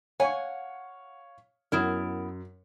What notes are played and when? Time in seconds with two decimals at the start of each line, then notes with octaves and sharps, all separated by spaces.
0.20 C#5 F5 F#5 G#5 C#6
1.72 F#2 B3 E4 A#4